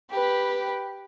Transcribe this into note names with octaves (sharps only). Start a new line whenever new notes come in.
G4 B4